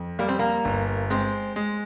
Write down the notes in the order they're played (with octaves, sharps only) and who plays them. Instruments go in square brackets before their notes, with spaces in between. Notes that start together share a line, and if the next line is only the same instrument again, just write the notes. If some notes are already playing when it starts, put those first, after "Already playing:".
Already playing: [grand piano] F2
[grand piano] G3 [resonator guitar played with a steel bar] A#3
[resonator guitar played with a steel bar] C4
A#3
[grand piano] G1
[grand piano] G#3 [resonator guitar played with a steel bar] C4
[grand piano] G#3